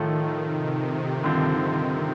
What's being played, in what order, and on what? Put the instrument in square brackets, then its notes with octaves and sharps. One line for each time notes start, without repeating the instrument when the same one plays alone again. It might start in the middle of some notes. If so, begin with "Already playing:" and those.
Already playing: [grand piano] A2 F3 A3 [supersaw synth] D#3
[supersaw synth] C3
[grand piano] G2 D3 F3 C4